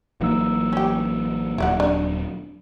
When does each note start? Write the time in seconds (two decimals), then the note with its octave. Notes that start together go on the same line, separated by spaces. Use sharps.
0.21 A1 E3 F#3 A#3 D#4 E6
0.73 C#4 G4
1.58 D#1 F#3 E4 D5 F#5
1.80 D4